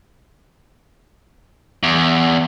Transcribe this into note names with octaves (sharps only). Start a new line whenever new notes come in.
E2